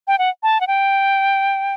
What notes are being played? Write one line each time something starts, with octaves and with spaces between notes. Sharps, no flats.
G5
F#5
A5
F#5
G5